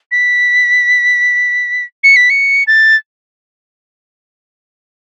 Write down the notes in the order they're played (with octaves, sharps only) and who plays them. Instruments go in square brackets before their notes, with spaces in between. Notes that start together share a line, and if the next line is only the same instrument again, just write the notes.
[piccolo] B6
C#7
B6
C#7
A6